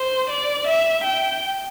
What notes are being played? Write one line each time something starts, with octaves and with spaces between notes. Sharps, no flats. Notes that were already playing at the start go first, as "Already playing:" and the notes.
Already playing: C5
D5
E5
G5